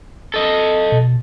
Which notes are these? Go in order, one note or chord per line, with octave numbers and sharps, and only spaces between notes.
A4 D#5
B2